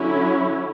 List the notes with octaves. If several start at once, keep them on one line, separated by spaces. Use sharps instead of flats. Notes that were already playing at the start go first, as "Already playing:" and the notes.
Already playing: D3 F#3 C#4 E4